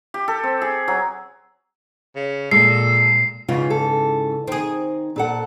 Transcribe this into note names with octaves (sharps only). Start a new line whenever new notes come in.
G4
A4
C4
G#4
F#3
C#3
A#2 G#3 A4 C7
G#2 C#3 E3 F4
A4
D#3 C4 G#4
A#2 A4 F#5